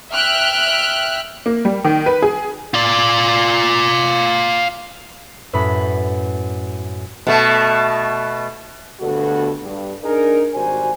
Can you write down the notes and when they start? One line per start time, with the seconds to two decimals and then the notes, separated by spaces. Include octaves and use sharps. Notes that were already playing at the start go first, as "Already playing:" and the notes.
0.12 E5 G5 F6 F#6
1.46 A#3
1.65 G3
1.85 D#3
2.06 B4
2.22 G#4
2.74 F4 D5
5.53 F#2 A2 B4 B5 B6
7.27 B2 A3
9.01 D2 G2 B2 B3 F#4 A4
9.63 G2
10.03 D4 D#4 G#4 A#4
10.55 G#1 G3 F#4 C5 G#5